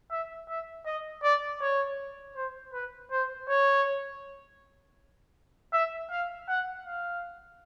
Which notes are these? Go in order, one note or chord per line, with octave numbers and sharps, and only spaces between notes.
E5
E5
D#5
D5
C#5
C5
B4
C5
C#5
E5
F5
F#5
F5